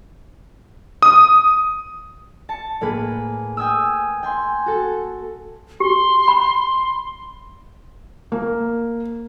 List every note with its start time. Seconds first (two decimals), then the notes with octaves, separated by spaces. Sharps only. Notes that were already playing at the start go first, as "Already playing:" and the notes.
1.02 D#6
2.49 A5 C#7
2.81 A2 A#3 G#4 B4
3.57 G5 G#5 D#6 E6
4.23 G5 G#5 C6
4.66 F#4 A4
5.80 G4 C6
6.28 B5
8.32 A#3